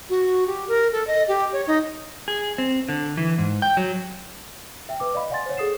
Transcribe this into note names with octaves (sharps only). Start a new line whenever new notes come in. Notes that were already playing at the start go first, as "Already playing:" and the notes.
F#4
G4
A#4
A4
D#5
G4
C#5
D#4
G#4
C4
D3
E3
G#2
G5
F#3
E5 G5
B4 D6
D5 D#5 F5 B5
D5 F5 F#5 G#5 C6 A6
C5 C#5
G#4 A4 D#6 C7 E7